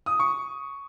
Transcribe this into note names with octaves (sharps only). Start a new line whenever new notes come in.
D#6
C#6